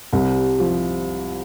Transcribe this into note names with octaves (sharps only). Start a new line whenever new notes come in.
C2
F3